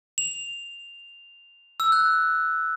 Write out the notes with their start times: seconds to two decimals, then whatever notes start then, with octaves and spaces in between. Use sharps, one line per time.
0.18 F7
1.80 E6
1.92 F#6